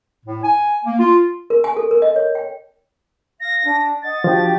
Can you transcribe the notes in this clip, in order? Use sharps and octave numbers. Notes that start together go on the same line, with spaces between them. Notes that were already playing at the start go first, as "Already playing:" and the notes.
A2
G#5
A#3
F4
A#4
G#5
A4
A#4
D#5
C#5
G5
F5 A#6
D4
D#5 F#5 A6
F3 D4 F#4 G4